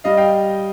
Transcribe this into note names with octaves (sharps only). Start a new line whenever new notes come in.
G3 D#5 F5
F5 G5